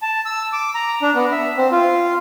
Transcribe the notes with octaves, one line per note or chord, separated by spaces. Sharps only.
A5
E6
D6
A#5
D4
B3
E5
C4
F4